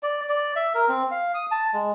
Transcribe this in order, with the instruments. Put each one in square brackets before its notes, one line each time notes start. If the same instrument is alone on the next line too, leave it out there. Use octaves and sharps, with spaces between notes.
[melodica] D5
D5
E5
A#4
C4
F5
D#6
A5
G#3